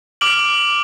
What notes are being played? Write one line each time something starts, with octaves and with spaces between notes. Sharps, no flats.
D6 F6 D7 F#7